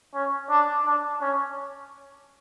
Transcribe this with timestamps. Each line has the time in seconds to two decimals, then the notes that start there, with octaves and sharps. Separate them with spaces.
0.14 C#4
0.50 D4
0.86 D4
1.21 C#4